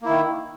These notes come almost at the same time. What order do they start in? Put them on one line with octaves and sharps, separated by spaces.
A#3 E4 D#3